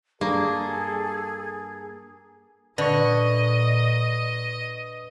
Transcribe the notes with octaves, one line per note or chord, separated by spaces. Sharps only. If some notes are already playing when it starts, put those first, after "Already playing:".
G2 A#3 G#4 A4
A#2 D3 B4 D#5 C#6